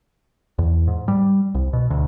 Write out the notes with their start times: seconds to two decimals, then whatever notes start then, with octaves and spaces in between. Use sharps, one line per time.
0.59 E2
0.87 G#2
1.08 G3
1.55 C2
1.73 B2
1.90 D2